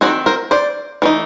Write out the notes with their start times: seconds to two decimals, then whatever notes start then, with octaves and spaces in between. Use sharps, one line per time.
0.01 D#3 G3 C4 F#4 G#4
0.26 A#4 C5
0.51 C5 D5
1.02 E3 A3 D#4